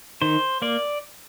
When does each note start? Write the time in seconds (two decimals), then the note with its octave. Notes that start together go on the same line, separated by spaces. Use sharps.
0.22 D#3 C5
0.62 A#3 D5